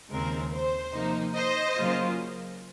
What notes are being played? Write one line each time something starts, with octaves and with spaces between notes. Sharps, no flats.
D#2 C#3 G#3 C4 A#4
C5
C3 F3 A#3 D#4
C5 D#5
C#3 F#3 A#3 F4